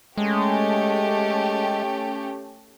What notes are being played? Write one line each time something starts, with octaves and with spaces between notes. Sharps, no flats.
G#3 A3 C#4 G4